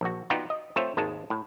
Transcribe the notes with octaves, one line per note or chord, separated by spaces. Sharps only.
A#1 F#4
B3 D#4 F4 F#4 D5 G5
D#5
A3 C4 F4 C5 C#5 E5
G#1 D#2 D#3 G#3 A5
A2